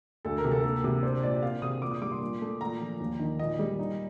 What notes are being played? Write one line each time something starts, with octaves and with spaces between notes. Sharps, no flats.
D2 A4
A#4
C3
A4
A#3 A4
C3
D4 C5
A#2 D5
C4 F5
C3 D#6
A#2 D6
D#6
G3 D6
C6
A#2
A3
A#2 A#5
F3
D#2
D#3
A#2 D#5
G3
D#4